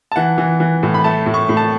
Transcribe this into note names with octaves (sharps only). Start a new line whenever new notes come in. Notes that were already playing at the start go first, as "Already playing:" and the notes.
A5
E3 F#5
E3
E3
A2
B5
A3 A5
A2
C#6
A2
A5